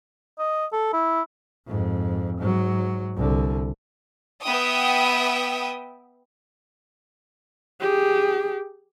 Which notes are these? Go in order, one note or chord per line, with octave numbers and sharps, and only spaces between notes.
D#5
A4
E4
F2 G#2
G#2 F#3
C2 D3
B3 E5 G5 D#6
G4 G#4